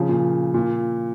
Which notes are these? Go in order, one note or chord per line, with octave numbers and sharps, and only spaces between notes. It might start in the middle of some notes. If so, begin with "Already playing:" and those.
Already playing: C#3 F3
A#2
A#2